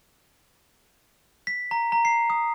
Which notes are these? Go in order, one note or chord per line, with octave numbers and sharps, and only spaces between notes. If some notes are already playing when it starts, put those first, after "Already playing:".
B6
A#5
A#5
C7
D#6